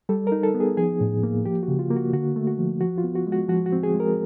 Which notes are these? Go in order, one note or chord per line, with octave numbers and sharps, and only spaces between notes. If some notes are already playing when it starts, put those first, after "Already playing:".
G3 A4
D#4 A#4
A4
B3
G#4
F3 G#4
A2
A#3
F3 G4
F#4
C#3
F4
A#3
F#4
D3 F#4
A3
F#4
F3
F3 F#4
F4
B3
F#4
G#3
F#4
F3 F#4
F#4
C4
G#4
G#3
A#4